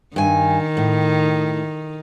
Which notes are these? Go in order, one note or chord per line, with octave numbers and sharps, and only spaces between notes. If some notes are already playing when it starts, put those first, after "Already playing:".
G2 D#3 G#5
A2